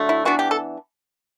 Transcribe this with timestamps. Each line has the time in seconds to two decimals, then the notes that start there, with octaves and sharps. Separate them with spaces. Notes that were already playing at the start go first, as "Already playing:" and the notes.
Already playing: D3 F#3 A3
0.09 E4
0.25 E3 B3 D4 F#4
0.39 G4
0.51 A4